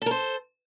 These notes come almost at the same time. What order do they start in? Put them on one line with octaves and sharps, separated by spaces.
A4 A#4 C5